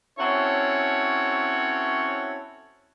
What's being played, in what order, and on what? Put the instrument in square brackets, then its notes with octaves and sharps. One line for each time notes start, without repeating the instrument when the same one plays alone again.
[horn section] C4 C#4 E4 F#4 A4 C#5